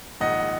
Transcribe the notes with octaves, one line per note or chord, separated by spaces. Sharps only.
A#1 G#2 D#3 D#5 F#5